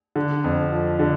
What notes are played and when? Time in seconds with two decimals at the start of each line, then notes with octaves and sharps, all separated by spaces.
0.16 D3
0.44 F2
0.72 F3
0.99 D3